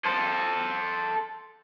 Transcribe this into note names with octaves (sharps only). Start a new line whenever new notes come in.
A4 C5